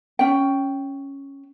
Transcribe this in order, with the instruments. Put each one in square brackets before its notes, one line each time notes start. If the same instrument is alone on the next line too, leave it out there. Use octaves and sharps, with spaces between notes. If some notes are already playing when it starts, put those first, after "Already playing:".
[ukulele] C#4 G5